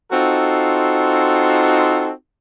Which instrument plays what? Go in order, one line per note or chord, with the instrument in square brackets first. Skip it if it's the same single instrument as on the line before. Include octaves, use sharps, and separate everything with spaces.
[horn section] C4 D#4 F4 F#4 A4